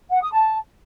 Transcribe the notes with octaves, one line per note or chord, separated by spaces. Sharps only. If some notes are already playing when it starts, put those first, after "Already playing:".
F#5
D#6
A5